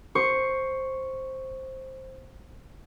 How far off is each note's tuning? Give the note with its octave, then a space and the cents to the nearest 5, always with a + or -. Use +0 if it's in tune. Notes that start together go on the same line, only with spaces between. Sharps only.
C5 +10 C#6 +0